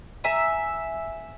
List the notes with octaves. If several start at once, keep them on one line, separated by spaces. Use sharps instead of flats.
E5 G#5 A#5